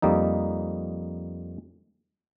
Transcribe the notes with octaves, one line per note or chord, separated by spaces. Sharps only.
F2 G3 A#3 D#4